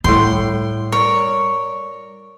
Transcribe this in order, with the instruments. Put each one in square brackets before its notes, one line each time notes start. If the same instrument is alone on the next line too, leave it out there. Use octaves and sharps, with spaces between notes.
[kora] A2 F#5 G5 [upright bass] G3 [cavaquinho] C6
[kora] A#4 D5 [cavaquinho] C#5